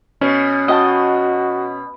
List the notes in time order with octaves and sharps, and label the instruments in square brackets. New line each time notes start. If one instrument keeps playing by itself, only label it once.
[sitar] B2 [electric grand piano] C#4
[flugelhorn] F#4 [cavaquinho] D#5 G5 A5